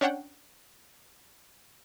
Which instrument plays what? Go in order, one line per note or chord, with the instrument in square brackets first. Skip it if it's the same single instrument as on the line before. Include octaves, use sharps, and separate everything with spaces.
[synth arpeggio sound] C#4 D4 C#5 F#5 G5